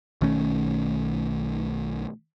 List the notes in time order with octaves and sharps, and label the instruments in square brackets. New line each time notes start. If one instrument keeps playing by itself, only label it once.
[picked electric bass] B1 D#3 A3 C#4